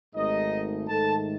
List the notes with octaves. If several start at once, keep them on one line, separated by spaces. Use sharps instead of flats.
G#1 G#2 D#3 A3 D#4 D#5
G#2 D#3 A3 A4 A5